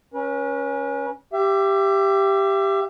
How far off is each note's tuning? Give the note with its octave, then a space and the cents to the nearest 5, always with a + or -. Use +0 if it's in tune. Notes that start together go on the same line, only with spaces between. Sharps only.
C#4 +0 B4 -40
G4 +0 E5 +35